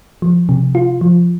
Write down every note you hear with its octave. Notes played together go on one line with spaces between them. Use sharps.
F3
C3
F4
F3